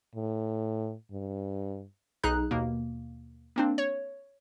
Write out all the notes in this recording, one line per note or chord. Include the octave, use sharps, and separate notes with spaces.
A2
G2
B1 D#4 G#4 A#5 F#6
D#2 B2 A#3
A#3 C4 D4
C#5